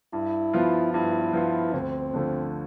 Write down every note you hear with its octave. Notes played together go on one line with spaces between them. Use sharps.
G2 E4
F3 B3 F4
G2 E4
F3 B3 F4
D2 C4
D3 F3 A3